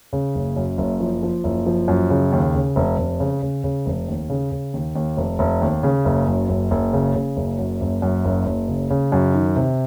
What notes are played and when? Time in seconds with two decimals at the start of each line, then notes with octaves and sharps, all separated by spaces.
0.13 C#3
0.35 F#1
0.56 F#2
0.78 F#1
1.00 F3
1.23 F3
1.44 F#1
1.67 F3
1.88 F#2
2.10 C#3
2.32 D#2
2.54 C#3
2.76 F1
2.98 F1
3.20 C#3
3.42 C#3
3.64 C#3
3.86 F1
4.08 D#2
4.30 C#3
4.52 C#3
4.74 D#2
4.95 D#2
5.17 F1
5.39 F1
5.62 D#2
5.83 C#3
6.05 F#1
6.27 F#2
6.49 F#1
6.71 F#1
6.93 C#3
7.15 C#3
7.37 F#1
7.59 F#2
7.81 F#1
8.02 F#2
8.25 F#1
8.46 F#1
8.69 C#3
8.90 C#3
9.12 F#2
9.34 D#3
9.56 C3